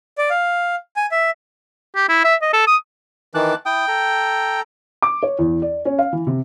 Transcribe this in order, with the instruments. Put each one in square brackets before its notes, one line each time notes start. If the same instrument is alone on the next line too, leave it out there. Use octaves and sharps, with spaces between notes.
[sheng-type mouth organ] D5
F5
G#5
E5
[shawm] G4
E4
E5
D#5
A4
D#6
[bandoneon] D#3 E3 [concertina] A5 D6 F#6
[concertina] E4 D#6 [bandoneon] G5
[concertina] A4 A#5
[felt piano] D6
C#5
E2
D5
C#4
F5
E3
C3